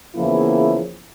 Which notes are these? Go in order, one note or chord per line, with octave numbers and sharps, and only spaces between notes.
E2 C#3 F3 A#3 E4